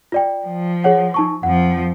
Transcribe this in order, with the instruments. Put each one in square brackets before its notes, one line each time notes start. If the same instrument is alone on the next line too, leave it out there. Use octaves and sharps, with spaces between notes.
[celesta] F4 D5 G5
[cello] F3
[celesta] G#4 C#5 F#5
D#4 A5 C#6
[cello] F2 F3 [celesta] F#5